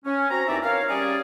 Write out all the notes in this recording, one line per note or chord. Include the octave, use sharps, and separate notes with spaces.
C#4
C4 F#4 A#5
D#2 E3 C4 D#4 D5 E5
A#4 C#5 F5
G3 C#4 G#4 D5